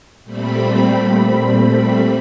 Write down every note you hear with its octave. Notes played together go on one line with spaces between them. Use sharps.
A#2 G3 A3 C4 B5